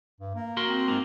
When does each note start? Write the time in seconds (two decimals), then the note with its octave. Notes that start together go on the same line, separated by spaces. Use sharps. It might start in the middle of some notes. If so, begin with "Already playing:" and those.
0.21 G2
0.35 A#3
0.57 F#4 A#4 C6
0.69 C4
0.88 G#2 A#3